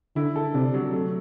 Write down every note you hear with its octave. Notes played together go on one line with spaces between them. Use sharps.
D3 E4
A4
C3 D4
F#3
A3